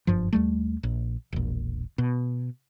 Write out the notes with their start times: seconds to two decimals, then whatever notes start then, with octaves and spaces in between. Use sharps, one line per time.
0.07 F#1 G2 F3
0.33 D#2 G3 A3
0.83 A#1
1.32 E1 A#1
1.98 B2